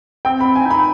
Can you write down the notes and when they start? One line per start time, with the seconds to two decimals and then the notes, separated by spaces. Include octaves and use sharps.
0.25 C4 G5
0.40 C4 B5
0.56 G#5
0.65 D#4
0.70 B5